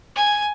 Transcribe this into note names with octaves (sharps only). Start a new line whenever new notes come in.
G#5